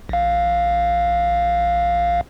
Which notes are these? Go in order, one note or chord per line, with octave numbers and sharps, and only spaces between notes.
A#1 F5